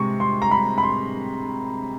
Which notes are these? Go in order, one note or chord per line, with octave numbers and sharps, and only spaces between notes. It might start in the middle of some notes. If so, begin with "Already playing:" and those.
Already playing: C3 G#3 C#6
C6
A#5
B5
B5
C6